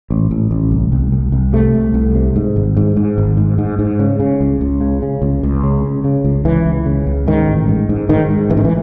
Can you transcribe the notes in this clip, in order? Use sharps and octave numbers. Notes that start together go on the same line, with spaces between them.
A1
A1
A1
C2
C2
C2
C2
C3 A3
C2
C2
C3
G#2
G#1
G#2
G#2
G#1
G#2
G#2
G#2
C#3
C#3
C#2
C#2
C#3
C#3
C#2
C#2
C#3
C#3
C#3
C#2
C#2 E3
C#2
C#3
C#2
G#2 D#3
A1
G#2
G#2
G#2 D#3
G#2
A1 E3
D#3
E3